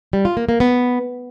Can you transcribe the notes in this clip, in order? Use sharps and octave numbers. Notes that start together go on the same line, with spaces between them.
G3
F4
A#3
A#3
B3